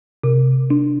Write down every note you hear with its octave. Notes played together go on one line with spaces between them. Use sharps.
C3
D4